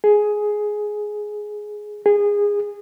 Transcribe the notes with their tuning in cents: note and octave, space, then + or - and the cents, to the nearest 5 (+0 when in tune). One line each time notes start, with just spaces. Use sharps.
G#4 +10
G#4 -20